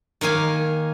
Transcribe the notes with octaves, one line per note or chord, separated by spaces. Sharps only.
D#3 A#3 F5 G#5